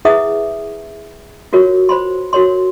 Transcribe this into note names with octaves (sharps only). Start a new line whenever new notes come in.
E4 G#4 B4 E5 F#5 D#6
F4 F#4 A#4 C#5
C5 B5 C6
F#4 A#4 C#5 C6